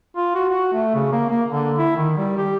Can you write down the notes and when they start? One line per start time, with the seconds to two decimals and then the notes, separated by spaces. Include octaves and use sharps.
0.16 F4
0.35 F#4
0.50 F#4
0.73 A3
0.95 C#3
1.12 A#3
1.30 A#3
1.48 D3
1.78 E4
1.96 D#3
2.17 G3
2.37 G4